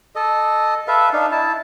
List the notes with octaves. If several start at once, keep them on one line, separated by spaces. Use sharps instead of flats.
A4 D#5
A4 B4 E5 F5
D4 D#4 F5
E4 A5